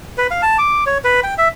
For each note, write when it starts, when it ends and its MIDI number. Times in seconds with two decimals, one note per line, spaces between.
0.18 0.27 71
0.31 0.41 77
0.42 0.57 81
0.58 0.84 86
0.86 0.98 73
1.04 1.20 71
1.24 1.34 79
1.38 1.48 76